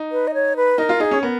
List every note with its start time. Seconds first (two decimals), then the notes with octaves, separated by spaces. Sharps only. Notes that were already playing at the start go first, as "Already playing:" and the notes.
Already playing: D#4
0.12 B4
0.27 D#5
0.34 C#5
0.56 B4
0.78 D#4 A#4
0.89 F4
1.00 D#4 G#4
1.11 C#4
1.22 B3 A#4